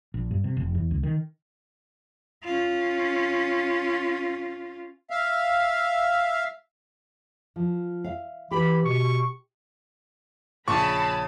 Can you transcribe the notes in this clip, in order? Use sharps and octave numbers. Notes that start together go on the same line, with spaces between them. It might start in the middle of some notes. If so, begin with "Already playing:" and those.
A#1
G2
C3
F1
E2
C#2
D#3
C#4 F4
E5 F5
F3
E5 F5
E3 G4 B5
B2 C#6
A#1 C#3 A5 B5 C#6